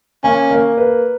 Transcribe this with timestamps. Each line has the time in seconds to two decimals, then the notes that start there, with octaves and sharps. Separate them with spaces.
0.24 A#3 C#4
0.51 A#3
0.77 B4